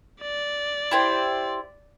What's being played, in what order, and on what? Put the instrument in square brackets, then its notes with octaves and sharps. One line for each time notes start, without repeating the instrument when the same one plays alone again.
[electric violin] D5
[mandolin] E4 G4 C5